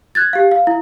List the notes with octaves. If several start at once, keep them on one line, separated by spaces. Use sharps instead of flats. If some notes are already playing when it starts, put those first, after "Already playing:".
F#6 G#6 A6
G4 F5
F5
E4